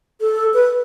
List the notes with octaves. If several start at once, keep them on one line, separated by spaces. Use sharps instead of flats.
A4
B4